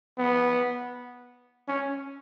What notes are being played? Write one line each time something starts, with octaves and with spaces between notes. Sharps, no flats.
B3
C#4